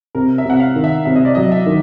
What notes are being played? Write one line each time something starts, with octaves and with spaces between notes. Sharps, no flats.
C3 A#4
E5
C3 F#5
F5
D#3
E5
C3 E5
D#5
D5
F#3 D#5
E5
D#3